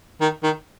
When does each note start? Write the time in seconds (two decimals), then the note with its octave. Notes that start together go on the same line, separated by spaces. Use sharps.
0.21 D#3
0.43 D#3